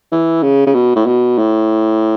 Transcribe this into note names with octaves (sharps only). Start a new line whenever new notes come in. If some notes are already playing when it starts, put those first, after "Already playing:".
E3
C#3
C#3
B2
A2
B2
A2